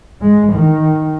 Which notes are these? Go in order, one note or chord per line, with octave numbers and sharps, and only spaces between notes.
G#3
D#3